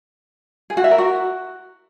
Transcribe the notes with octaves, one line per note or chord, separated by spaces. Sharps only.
G#4
F#4
E5
A#4
F#4